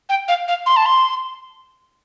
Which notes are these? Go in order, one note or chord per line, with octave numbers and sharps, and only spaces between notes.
G5
F5
F5
C6
A5
C6